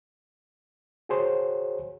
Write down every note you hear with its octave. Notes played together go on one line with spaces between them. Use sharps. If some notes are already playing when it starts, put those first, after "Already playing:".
F#4 G#4 C5 C#5